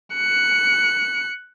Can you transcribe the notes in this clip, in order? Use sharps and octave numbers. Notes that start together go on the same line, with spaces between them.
F#6 C#7